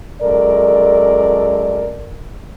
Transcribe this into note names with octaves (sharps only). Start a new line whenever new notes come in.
F#2 G#3 A4 A#4 D5